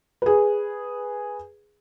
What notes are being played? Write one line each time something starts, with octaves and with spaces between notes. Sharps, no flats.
G#4 B4